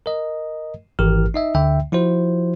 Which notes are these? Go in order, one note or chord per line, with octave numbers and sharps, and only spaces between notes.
A#4 D#5
G#1 E3 G4 A#4 F6
D#4 D#5 E5
D2 D3 E5 G5
F3 E4 F#4 C5